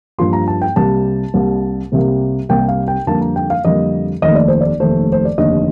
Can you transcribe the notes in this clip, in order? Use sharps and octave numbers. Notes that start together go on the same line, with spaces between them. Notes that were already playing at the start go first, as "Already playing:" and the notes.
G2 F3 A#3 C6
A#5
A5
G5
C2 C3 G3 A#3 A5
C2 C3 G3 A#3
C2 C3 G3 A#3
C2 C3 G3 A#3 G5
F5
G5
F2 D3 G3 A#3 A5
A#5
G5
F5
F2 D3 G3 A#3 D#5
F1 D#2 D#3 A3 D#5
D5
C5
D5
F1 D#2 D#3 A3 C5
C5
D5
F1 D#2 D3 D#5